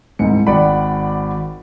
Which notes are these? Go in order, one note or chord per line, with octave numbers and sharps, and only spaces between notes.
C2 G#2 C#7
G#1 D#3 D5 F#5 B5